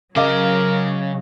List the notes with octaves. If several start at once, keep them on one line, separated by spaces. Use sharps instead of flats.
C#3 F#3 G#4 A#4 D#5 F5 D6